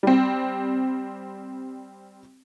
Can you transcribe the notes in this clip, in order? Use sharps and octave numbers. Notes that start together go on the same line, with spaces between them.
G3 C4